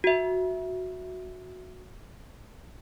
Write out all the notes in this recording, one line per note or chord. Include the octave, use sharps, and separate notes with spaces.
F#4 E5